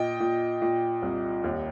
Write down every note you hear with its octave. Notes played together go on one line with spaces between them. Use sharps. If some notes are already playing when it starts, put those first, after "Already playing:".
Already playing: A#2 D#5 G5
A#2
A#2
C2
D#2